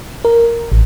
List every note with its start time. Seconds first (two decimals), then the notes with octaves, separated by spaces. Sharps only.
0.25 A#4
0.72 A1